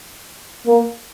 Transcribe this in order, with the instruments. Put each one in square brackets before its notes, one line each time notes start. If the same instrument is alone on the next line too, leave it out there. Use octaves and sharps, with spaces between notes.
[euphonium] A#3